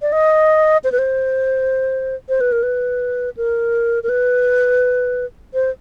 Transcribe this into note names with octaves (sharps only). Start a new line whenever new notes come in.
D5
D#5
C5
B4
C5
C5
B4
A#4
B4
A#4
A#4
B4
C5